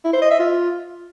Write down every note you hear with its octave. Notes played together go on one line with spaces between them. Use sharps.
E4
C5
D#5
E5
F4